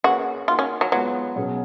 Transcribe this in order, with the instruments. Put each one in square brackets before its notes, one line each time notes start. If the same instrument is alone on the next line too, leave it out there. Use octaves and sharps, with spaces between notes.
[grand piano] A#3 C#4 G#4 B4 [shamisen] F#4
[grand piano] A#3 D#4 F#4 [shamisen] F4
[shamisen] C#4
F#3
[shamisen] F#3 [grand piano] G#3 B3 F4 B4
[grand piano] B2 F#3 C#4 G#4